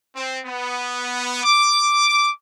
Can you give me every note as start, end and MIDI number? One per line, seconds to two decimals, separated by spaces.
0.15 0.39 60
0.45 1.41 59
1.43 2.29 86